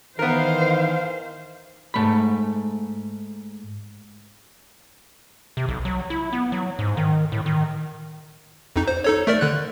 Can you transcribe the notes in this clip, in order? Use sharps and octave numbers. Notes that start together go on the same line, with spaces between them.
D#3 E3 B3 A#4 C5 F5
G#2 A3 B5
C3
B1
F#3
E4
B3
F#3
G#2
D#3
A2
D#3
F2 D#4
C5
D#4 A4 C#5
A3 A#4 D5
D3 F#6